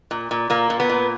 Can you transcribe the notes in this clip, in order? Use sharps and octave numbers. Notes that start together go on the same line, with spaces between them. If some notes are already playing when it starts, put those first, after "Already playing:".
A#2
A#2
A#2 A#3
A#2
B3
A#2